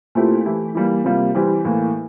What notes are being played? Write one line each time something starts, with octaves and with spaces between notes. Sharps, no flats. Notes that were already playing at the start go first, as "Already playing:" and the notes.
A#2 A3 C4 E4 G4
E3 A3 E4 G4
E3 G3 A#3
C3 G3 A#3 F4
E3 G3 C4 G4
A2 E3 A#3